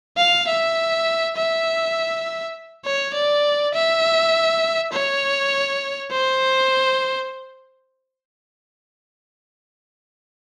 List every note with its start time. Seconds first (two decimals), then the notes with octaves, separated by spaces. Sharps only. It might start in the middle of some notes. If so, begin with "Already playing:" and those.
0.17 F5
0.48 E5
1.37 E5
2.85 C#5
3.14 D5
3.74 E5
4.92 C#5
6.11 C5